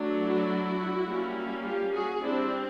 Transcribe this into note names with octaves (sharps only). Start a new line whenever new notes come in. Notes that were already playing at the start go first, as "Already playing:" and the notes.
Already playing: F#3 A3 D4
E4 F#4
G3 A#3 C#4
F4 G4
F#4 G#4
G3 C4 D4 E4